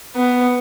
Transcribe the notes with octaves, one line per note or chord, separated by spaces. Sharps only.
B3